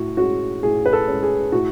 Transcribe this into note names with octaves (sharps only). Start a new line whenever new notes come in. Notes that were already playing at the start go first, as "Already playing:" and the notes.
Already playing: A2 F#4
G#3 C#4 F#4
A2 G#4
B4
A4
G#3 C#4
G#4
A2 F#4